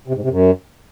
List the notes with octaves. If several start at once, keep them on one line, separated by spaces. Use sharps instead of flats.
C3
G#2
C3
F#2